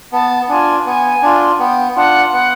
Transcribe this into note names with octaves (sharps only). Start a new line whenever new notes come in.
B3 A5
D4 F4 G#5
B3 G#5
D4 F4
B3 G5
D4 F4 F#5
B3 F#5